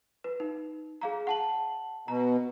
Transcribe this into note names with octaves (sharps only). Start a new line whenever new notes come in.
B4
D#4
G#4 F5 A#5
F#5 A5 F#7
B2 A#5